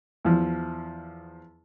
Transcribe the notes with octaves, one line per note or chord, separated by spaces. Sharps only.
E2 F3